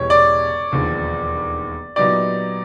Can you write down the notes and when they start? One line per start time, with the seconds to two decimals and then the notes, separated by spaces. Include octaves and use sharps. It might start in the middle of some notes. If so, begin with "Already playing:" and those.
Already playing: E1 E2 B2 G3 C#5
0.10 D5
0.72 E1 D#2 D3 F3
1.96 A#2 F#3 B3 D#4 G4 D5